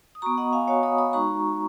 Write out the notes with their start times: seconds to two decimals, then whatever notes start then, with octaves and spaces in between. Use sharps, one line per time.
0.15 D#6
0.22 B3 F#4 A#5 C#6
0.38 D#5 F#5
0.53 F5 G#5
0.67 B3 F#4 C#5 F5
0.83 B5 D#6
0.98 B5 D#6
1.13 G#3 D#4 F#4 A#5 C#6